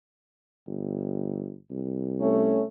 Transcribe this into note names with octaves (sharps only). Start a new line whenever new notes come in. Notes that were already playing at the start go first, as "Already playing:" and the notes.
G1
C2
A3 C#4